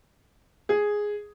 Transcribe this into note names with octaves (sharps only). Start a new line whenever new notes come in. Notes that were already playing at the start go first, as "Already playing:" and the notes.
G#4